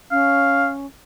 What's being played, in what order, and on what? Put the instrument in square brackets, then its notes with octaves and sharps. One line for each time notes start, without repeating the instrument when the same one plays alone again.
[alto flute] C#4 [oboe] F5